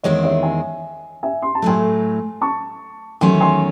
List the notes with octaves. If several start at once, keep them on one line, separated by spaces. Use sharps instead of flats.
E2 D#3 G#3 C4 C#5
C#5 E5
E5 G#5
E5 G#5
C6
A5
A2 F#3 A3 G#5 C6
A5 C#6
E2 D#3 F#3 A3 C#4 G#5 C6
G#5 C6